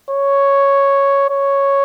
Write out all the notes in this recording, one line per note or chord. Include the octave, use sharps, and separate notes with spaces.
C#5
C#5